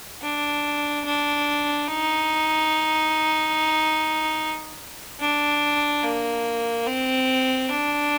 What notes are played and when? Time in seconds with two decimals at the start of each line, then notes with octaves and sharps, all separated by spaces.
0.22 D4
1.05 D4
1.88 D#4
5.21 D4
6.03 A#3
6.86 C4
7.69 D4